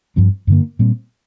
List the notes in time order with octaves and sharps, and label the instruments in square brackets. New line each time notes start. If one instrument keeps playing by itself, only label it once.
[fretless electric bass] G2 F3 C4
G2 D3 A#3
A#2 G3 C4